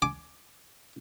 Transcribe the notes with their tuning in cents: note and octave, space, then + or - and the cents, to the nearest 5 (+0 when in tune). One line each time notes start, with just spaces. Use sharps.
G#5 +15 D6 +0